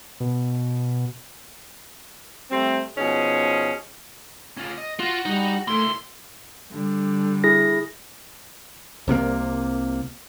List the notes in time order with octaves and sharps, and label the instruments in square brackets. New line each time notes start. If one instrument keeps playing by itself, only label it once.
[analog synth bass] B2
[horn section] G3 A3 C4
B2 F3 C#4 D#4 G#4
[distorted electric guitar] C#4 F4
D#5
[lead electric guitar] F4 [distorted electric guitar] F#4
[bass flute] G3 [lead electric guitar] D#4
[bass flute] A3 [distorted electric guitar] A#3 E4 [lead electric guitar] C6
[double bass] D3 G3
[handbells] E4 G#4 A#6
[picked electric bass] C2 C3 G3 A#3